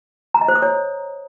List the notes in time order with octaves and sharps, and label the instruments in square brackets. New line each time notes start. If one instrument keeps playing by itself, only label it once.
[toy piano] A#5
D#5
C5
D#6
C#5